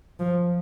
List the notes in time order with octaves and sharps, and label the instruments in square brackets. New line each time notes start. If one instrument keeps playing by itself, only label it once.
[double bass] F3